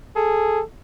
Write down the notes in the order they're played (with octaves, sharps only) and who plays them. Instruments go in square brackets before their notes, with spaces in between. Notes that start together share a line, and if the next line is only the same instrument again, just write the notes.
[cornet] G#4 [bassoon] A4